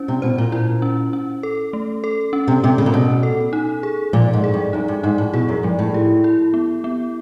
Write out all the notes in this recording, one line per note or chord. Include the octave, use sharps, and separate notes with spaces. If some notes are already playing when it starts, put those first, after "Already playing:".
Already playing: C#4 E4 C5
C3
B2 C5
A#2
A#2 E4
C#4
C#4
A4
A3
A4
C#4
C3
C3 C#4
C#3
A#2
B2 C#4
A4
D#4
G#4
A#2 F3
G#2
G#4
G2
F#2 D#4
G2
G#2 D#4
A2
B2 G#4
F#2
G2 F3
A2
G4
E4
B3
B3